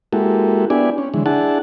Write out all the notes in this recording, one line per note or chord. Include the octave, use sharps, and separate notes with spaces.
G#3 A#3 E4 F#4 G4 A4
B3 D4 E4 G4 D5 G#5
C#4
D3 E3 G#3
D4 E4 G#4 F#5 A5